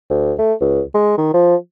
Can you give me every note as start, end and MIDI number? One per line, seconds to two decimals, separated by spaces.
0.10 0.33 38
0.39 0.53 57
0.61 0.82 37
0.95 1.16 56
1.18 1.33 51
1.34 1.56 53